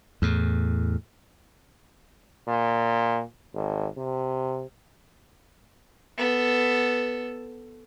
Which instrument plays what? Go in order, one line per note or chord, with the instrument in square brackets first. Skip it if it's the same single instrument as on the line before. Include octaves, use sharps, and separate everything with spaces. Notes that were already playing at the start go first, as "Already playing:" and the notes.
[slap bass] E2 A2
[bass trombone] A#2
G#1
C3
[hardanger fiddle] B3 A4